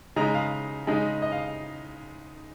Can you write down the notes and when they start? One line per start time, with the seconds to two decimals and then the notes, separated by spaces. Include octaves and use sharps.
0.16 C#3 G#3 D#4 A#5
0.34 F5
0.87 C#3 G#3 D#4
1.22 D#5
1.32 F5